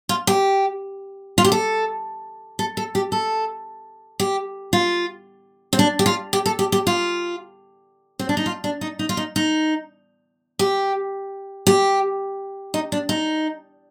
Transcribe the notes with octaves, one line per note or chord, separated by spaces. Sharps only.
F4
G4
F4
G4
A4
A4
A4
G4
A4
G4
F4
C4
D4
G4
F4
G4
A4
G4
G4
F4
C4
D4
D#4
F4
D4
D#4
D#4
F4
D#4
D#4
G4
G4
D#4
D4
D#4